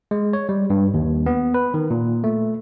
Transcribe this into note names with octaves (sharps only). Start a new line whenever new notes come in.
G#3
C#5
G3
G2
D#2
B3
B4
D#3
A#2
A3